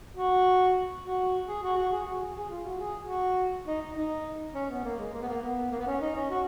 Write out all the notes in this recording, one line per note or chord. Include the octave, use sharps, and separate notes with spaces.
F#4
F#4
G#4
F#4
F#4
G#4
F#4
G#4
G#4
F4
F#4
G#4
F#4
D#4
D#4
D#4
C#4
B3
A#3
G#3
A#3
B3
A#3
B3
A#3
B3
C#4
D#4
C#4
F#4